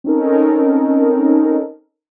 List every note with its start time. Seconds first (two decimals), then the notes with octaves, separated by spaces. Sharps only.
0.04 C4 C#4 D#4 A4 A#4